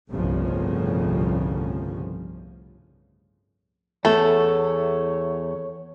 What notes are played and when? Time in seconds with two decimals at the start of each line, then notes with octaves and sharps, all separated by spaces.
0.11 G1 C2 A2 C#3 F3
4.05 E2 A3 A4 C#5